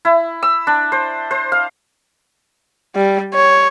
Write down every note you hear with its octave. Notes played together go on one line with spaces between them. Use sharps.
E4
E6
D4
C5
C5
F5
G3
C#5